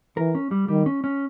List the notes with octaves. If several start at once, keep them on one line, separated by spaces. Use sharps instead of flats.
E3 A#4
C#4
G3
D#3 G3
C#4
C#4